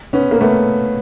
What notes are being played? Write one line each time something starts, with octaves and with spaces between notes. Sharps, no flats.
B3 C#4
A#3
A3 B3